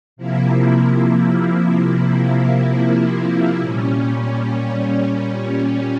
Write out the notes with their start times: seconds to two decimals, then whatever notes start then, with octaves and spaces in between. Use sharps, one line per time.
0.16 C3 F3 A#3 E4
3.60 A#2 G3 C#4